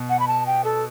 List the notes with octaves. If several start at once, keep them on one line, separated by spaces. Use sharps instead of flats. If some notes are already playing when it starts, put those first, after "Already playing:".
Already playing: B2
F#5
B5
A5
G5
A4